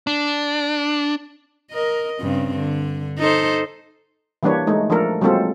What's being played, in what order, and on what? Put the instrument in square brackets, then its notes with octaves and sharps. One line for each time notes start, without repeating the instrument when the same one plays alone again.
[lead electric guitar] D4
[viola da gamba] A#4 D#5
G2 C#3 C4
D3
D#4 A4 C5
[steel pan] E3 G3 A#3 D4 B4 C#5
G#3 A3 D#4
F3 A3 D4 A4 A#4
F#3 G#3 A#3 C4 F4 A4